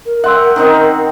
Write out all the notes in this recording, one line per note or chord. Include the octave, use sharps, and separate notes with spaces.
A#4
E5 F#5 G5 C6 E6
D#3 C4 D#4